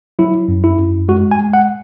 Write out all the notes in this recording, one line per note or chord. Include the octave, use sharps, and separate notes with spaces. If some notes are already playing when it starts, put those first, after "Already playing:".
F#3 E4
F#2
E4
F#2
G#3 F#4
G#5
G#3
F#5